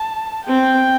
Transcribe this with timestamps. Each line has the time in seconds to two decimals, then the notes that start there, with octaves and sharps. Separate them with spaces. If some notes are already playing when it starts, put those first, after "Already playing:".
Already playing: A5
0.47 C4 G5